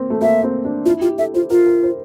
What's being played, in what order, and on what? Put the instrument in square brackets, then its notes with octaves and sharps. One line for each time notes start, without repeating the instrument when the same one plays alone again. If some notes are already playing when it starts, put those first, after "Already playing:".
Already playing: [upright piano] A#3 C4
A3
[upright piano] A#3 [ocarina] E5
[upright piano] C4
D4
[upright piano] E4 [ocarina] F4
[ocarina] F4 [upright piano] G4
[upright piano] A4 [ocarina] E5
[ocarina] F4 [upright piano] C5
[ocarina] F4 [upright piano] A#4
[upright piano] A#4
C5